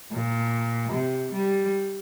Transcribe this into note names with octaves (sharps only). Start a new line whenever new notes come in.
A#2
C3
G3